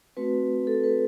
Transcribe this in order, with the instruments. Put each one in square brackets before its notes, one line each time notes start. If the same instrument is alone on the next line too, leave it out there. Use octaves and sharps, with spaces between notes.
[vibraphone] A3 C4 F#4 B4
A4
B4